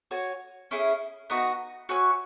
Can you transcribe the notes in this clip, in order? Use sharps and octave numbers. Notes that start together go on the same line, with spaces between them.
F#4 C#5 G#5
C#4 E4 G#4
B3 D#4 F#4
F#4 C#5 E5 G#5